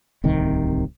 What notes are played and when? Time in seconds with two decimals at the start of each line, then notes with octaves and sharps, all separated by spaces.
0.24 D1 C2 C3 D#3